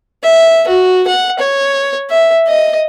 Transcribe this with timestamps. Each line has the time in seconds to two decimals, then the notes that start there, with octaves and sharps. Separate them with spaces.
0.23 E5
0.68 F#4
1.07 F#5
1.39 C#5
2.10 E5
2.47 D#5